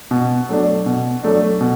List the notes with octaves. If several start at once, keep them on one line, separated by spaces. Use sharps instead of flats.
B2
F#3 A3 D4
B2
F#3 A3 D4
B2